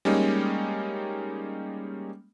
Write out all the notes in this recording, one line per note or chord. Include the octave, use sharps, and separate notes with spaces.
G3 G#3 A#3 C#4 D#4